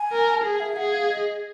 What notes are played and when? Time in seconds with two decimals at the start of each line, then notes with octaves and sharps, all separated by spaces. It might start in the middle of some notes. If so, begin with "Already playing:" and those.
Already playing: G#5
0.12 A#4
0.34 A5
0.44 G#4 G#5
0.60 E5
0.76 G#4 F#5
0.92 F5
1.08 D#5